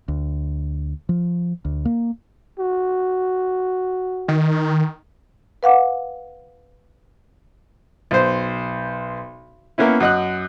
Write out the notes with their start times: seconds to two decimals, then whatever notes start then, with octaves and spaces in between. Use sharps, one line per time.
0.08 D2
1.09 F3
1.65 D2
1.85 A#3
2.59 F#4
4.28 D#3
5.63 B4 F5 F#5 D6
8.11 B1 C5
9.78 A#3 B3 C#4 E4
10.00 F#2 D#5 F#6